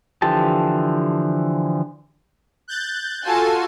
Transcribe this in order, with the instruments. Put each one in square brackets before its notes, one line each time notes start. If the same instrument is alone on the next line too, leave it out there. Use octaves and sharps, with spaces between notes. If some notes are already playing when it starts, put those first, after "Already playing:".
[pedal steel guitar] D3 E3 F3 G4 A5
[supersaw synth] F#6 G6 A6
[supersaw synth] F4 F#4 A4 [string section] G#5 A5